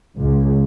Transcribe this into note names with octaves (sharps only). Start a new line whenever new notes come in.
C#2